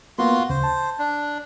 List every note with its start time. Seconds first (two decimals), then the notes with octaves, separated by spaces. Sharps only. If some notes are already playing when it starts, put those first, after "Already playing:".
0.19 A#3 B3 F4 F#4 C6
0.50 D2 C#3 C5
0.64 A5
0.99 D4